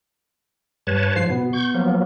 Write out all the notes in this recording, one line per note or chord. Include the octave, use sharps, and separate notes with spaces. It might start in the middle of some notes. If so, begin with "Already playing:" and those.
G2 B4 C#5 A5
G#2 F3 C7
B2 B3
C#6 G6
F3 F#3 A#3